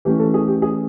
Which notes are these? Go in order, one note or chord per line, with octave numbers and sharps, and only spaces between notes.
E3 A3 C#4 G4
A4
G#4
G4
G#4